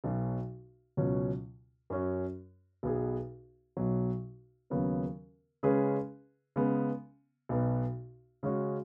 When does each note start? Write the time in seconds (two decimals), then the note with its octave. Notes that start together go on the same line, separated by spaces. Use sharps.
0.04 B1 B2 F#3
0.97 C#2 B2 F#3 C#4
1.90 F#2 F#3 C#4 F#4
2.83 B1 B2 B3 G#4 B4
3.77 B1 B2 F#3
4.70 D#2 C#3 F#3 B3
5.63 C#3 G#3 C#4 G#4 B4
6.56 C#3 G#3 B3
7.49 B1 B2 B3
8.43 C#3 G#3 C#4 F#4